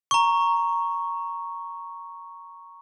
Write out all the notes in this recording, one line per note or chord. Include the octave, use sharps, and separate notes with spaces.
A#5 C#6